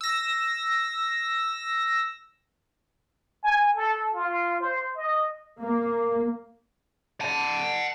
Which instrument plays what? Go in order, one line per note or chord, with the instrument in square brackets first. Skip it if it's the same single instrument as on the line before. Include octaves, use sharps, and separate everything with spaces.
[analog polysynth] E6 A#6
[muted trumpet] G#5
A4
F4
C5
D#5
[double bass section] A#3
[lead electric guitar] F#5 A5